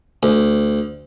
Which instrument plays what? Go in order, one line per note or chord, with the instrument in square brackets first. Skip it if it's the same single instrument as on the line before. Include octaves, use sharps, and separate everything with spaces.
[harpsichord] D2